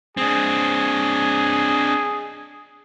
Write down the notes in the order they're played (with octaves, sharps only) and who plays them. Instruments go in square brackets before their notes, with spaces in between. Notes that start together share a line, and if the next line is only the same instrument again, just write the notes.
[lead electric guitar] C4 D4 [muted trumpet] G#4